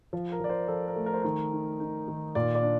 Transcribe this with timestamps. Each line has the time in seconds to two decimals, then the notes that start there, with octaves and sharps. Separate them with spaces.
0.13 F3
0.32 A#4
0.40 F3 D5
0.49 C5
0.68 F3 A4
0.88 A#4
0.96 A3
1.06 A#4
1.14 C5
1.23 D#3 A#4
1.53 D#4
1.80 D#4
2.08 D#3
2.35 A#2 D5
2.55 D5
2.63 D4